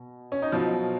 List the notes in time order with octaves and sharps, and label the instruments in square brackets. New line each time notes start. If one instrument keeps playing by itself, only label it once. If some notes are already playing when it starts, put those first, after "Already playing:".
Already playing: [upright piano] B2
C#4
D#4
B2 F3 F#3 F4